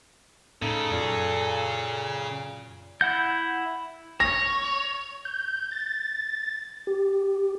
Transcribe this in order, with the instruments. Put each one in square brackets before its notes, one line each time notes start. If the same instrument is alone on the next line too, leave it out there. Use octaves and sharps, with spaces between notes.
[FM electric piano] A2 C#4 [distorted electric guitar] C#3 [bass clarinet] D#4 [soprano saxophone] A4
[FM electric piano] F#2 [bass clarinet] A#2
[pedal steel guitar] E4 F#5 G6
[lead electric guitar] C#5 [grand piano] A#6
[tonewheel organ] G6
A6
G4